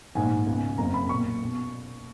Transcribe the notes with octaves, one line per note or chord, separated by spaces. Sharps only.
A#1 G#2 D#3 G#5
C#2 B2
F#1 F2 C#3 A#5
B5
B1 A#2 C#6
B2